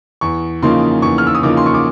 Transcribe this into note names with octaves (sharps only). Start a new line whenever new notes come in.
E2 C#6
C#3 F3 A#3 D#4 C6
E2 C#6
F6
E6
D#6
C#3 F3 A#3 D#4 D6
C6
C#6
D6